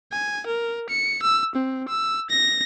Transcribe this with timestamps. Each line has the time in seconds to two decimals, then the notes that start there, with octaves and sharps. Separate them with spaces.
0.12 G#5
0.47 A#4
0.90 C#7
1.22 E6
1.55 C4
1.89 E6
2.30 A#6